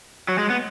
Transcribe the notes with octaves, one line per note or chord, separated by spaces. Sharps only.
F#3
G#3
B3